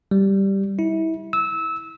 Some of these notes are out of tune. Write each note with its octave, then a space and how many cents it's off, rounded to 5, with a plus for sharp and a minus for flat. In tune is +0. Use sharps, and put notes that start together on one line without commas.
G3 -5
E4 -30
E6 -20